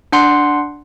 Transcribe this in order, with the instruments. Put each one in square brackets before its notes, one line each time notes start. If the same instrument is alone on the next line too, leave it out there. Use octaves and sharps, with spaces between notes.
[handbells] D4 F#5 C6